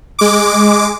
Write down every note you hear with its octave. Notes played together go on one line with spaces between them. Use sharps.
G#3 D6